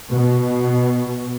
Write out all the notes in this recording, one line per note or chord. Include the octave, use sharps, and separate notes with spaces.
B2